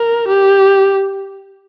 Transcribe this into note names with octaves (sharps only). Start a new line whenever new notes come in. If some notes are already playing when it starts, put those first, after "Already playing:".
Already playing: A#4
G4